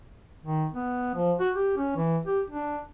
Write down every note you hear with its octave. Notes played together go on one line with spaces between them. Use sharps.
D#3
B3
F3
F#4
G4
C#4
E3
G4
D4